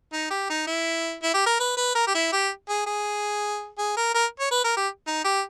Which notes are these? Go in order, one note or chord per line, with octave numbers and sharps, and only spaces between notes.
D#4
G4
D#4
E4
E4
G4
A#4
B4
B4
A#4
G4
E4
G4
G#4
G#4
G#4
A#4
A#4
C#5
B4
A#4
G4
D#4
G4